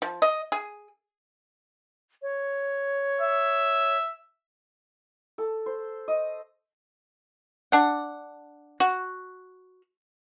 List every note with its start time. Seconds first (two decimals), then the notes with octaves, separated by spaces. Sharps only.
0.02 F3
0.22 D#5
0.52 G#4
2.22 C#5
3.21 E5
5.38 A4
5.66 C5
6.08 D#5
7.72 D4 F#5
8.80 F#4